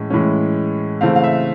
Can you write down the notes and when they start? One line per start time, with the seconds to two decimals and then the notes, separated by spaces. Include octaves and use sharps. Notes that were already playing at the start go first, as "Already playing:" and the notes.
Already playing: A2 E3 G#3 C#4
0.10 A2 E3 G#3 C#4
1.01 C#3 E3 A3 C4 F5
1.16 F5
1.24 E5